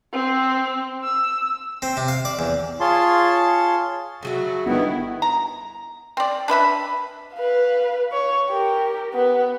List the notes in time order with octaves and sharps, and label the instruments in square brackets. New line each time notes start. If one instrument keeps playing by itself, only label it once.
[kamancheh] C4
E6
[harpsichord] C4
C3
F5
D5
E2
[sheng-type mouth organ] F4 G#4 C#5 A5 C6
[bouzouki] C#3 F#3 A3 [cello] F#4
[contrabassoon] G1 [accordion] D#3 B3 [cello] E4
[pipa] A#5
C4 D5
D4 B4 E5 B5
[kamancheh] B4 F5
C#5
G4 A#4
B3 B4